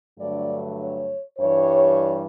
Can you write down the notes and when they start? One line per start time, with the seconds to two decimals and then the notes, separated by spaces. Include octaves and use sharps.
0.19 G2 D3 F#3 A3 D5
0.80 C#5
1.39 G2 E3 G3 C#5